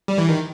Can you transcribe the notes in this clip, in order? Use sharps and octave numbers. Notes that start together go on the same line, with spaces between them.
G3
E3
D#3